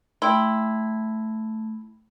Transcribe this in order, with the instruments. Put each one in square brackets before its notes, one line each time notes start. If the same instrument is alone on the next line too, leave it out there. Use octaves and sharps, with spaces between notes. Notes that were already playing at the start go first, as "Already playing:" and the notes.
[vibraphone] A3 [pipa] E4 [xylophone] G5 C6